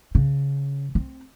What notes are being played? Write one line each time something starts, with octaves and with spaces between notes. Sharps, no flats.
C#3
C4